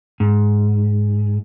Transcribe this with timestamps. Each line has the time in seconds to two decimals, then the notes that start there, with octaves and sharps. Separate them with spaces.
0.20 G#2